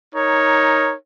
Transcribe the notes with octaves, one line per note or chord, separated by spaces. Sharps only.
D#4 A#4 C#5